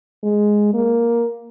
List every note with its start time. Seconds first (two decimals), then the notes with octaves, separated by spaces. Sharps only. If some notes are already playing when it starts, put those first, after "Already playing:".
0.23 G#3
0.73 A#3